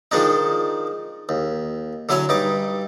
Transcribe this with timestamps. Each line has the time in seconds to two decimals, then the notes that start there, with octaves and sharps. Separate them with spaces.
0.11 D#3 F3 G#3 D4 D#4
1.29 D#2
2.09 D3 F#3 E4 C#5 G#5
2.29 G2 D#4 D6